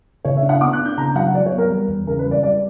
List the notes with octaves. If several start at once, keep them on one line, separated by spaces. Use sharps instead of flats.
C#3 C#5
E5
D4
F#5
B3 D6
F#6
D4
G6
C#3 A#5
F#3 F#5
F#3 D5
C#5
B3
A#4
G3
E2
C#3 A#4
B4
G3
D5
G3 D5